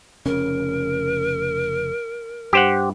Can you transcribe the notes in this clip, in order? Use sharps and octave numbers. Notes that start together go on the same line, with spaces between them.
F1 C#3 C#4 A#4
G2 G4 C5 F#5